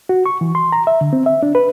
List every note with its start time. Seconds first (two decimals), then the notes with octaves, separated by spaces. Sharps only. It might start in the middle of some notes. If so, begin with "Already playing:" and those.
0.09 F#4
0.26 C#6
0.41 E3
0.55 C6
0.72 A#5
0.87 E5
1.01 D3
1.13 C4
1.26 E5
1.43 D4
1.55 B4